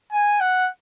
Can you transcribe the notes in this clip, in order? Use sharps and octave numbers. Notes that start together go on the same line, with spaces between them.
G#5
F#5